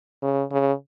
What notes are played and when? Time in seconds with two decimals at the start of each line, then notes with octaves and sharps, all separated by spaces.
0.23 C#3
0.52 C#3